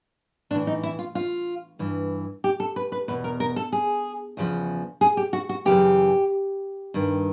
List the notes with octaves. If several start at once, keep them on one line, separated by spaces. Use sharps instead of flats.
A2 E3 D4
D#4
E4
F4
F4
G2 E3
G4
A4
B4
B4
E2 B2 B4
A#4
A#4
A4
G#4
E2 C#3 F3
G#4
G4
F#4
F#4
F#2 C#3 E3 G4
G2 D#3